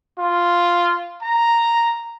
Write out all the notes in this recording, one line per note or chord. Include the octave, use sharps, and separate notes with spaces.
F4
A#5